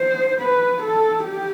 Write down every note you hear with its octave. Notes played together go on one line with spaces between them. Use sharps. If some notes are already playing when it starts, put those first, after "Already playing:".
Already playing: C5
B4
A4
G4